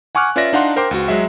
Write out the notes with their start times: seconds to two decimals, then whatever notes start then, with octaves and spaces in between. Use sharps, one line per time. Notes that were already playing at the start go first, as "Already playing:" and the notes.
0.15 F#5 G#5 C#6 D6 F6 F#6
0.36 C#4 F4 B4 D5 E5 A#6
0.53 D4 D#4 F5 F#5 C6
0.76 A#4 C5 G5 C6 D6
0.91 C#2 F#4
1.08 F#3 G#3 E5